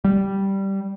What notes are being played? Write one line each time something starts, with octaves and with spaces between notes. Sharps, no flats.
G3